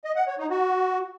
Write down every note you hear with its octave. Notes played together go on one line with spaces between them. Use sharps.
D#5
F#5
C#5
D#4
F#4